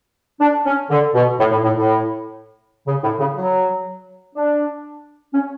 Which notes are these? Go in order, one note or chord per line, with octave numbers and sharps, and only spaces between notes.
D4
C#4
D3
B2
A2
A2
A2
A2
C#3
A2
C#3
F#3
D4
C#4